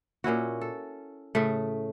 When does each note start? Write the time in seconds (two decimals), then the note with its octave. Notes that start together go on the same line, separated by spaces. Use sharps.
0.24 A#2 C#4 E4 F#4
0.61 A4
1.35 A2 C#3 A3